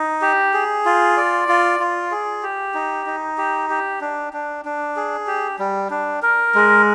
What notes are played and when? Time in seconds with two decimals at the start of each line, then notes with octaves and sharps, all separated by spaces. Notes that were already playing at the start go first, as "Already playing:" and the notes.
Already playing: D#4
0.22 G4
0.54 G#4
0.86 F4
1.17 D5
1.48 F4
1.80 F4
2.11 G#4
2.43 G4
2.74 D#4
3.06 D#4
3.38 G4
3.70 G4
4.01 D4
4.33 D4
4.65 D4
4.96 G#4
5.27 G4
5.59 G3
5.91 D4
6.22 A#4
6.55 G#3